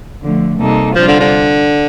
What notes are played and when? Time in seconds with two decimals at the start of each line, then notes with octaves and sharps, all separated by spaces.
0.23 D3 F3 A3
0.60 C3 G3 A#3 D#4 A4
0.96 C3 F3 G3 D4 F4 C5
1.08 D3
1.20 D3